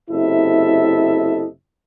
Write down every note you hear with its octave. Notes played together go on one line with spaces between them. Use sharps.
F#1 C3 E4 A4 D#5 E5